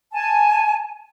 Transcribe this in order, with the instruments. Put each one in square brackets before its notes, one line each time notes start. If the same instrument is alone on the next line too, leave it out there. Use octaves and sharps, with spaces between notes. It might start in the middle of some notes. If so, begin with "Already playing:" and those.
[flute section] G#5 A5